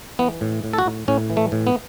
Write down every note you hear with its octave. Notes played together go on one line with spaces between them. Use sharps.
E3 B3
A2
A2
A4
F#4
A2
A2 C#4
E3
A3
A2
B3